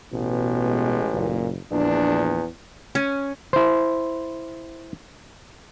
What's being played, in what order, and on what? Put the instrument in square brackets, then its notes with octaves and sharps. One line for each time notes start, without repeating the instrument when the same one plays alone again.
[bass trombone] A1 [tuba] B2
[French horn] G#3
[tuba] F#1 [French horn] A#2
[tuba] A#1 [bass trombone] E2 [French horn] D4
[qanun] C#4
[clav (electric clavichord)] E4 C5